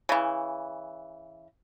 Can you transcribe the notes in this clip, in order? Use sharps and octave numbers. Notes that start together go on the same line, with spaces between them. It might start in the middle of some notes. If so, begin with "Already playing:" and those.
C#3 E3